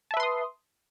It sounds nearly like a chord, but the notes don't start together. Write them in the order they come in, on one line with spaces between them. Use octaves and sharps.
A5 E5 B4 C6 D#6